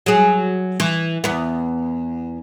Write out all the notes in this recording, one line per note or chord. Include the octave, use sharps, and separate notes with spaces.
F#3 G#4
E3
E2 B3